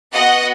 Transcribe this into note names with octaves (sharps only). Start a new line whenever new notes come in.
B3 F#4 D#5 F#5